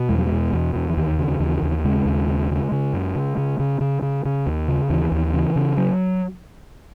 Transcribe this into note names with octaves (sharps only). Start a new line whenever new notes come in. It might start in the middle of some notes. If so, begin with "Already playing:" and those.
Already playing: B2
E2 G#3
F#3
B2 G#3
E2
E2
E3
D#2 D#3
C#3
D#2 E3
D#2
C#3 G#3
D#2
C#3
C#3
C#3
F#2
C#3
C#3
C#3
C#3
C#3
C#3
D#2
C#3
D#2 E3
D#2
C#3 E3
C#3
F#3